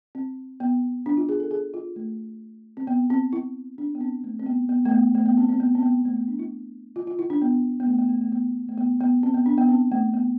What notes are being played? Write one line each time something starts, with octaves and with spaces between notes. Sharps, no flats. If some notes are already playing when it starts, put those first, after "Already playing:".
C4
B3
D4
F4
G#4
A4
G#4
F4
A3
C4
B3
C4
E4
D4
B3
C4
A3
C4
B3
B3
A3
B3
A3
B3
C4
C4
B3
C4
B3
A3
B3
D4
E4
F4
F4
E4
D4
B3
B3
A3
B3
A3
A3
B3
A3
B3
B3
C4
B3
D4
B3
C4
A3
B3